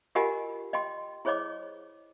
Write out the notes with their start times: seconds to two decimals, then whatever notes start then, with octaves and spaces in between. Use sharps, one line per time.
0.15 F4 G4 A#4 D#5 F#5 G#5
0.73 D#5 G5 C6
1.25 E4 G#4 C5 C#5 D#5 D6